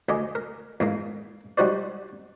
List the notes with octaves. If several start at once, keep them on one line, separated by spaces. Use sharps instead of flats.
D2 D#5 G#5 D6
A#4
E2 G#2 A#3
G3 D#4 F#4 C5 D5